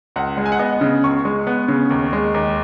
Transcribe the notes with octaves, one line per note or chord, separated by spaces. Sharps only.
C#2 F#5
G#3
G#5
F#5
B3 D#5
C#3
C#2 C#6
G#3
B3
C#3
D#2
G#3
D#2